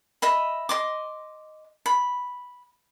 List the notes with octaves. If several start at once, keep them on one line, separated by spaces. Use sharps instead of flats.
D#5 E5 B5
D#5 C6 D6
B5